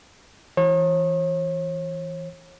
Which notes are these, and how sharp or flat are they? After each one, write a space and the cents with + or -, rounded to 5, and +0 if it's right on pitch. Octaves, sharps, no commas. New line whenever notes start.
E3 +0 C#5 -40